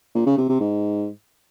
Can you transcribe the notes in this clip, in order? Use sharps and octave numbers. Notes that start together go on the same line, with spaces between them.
A#2
C#3
C3
C3
G#2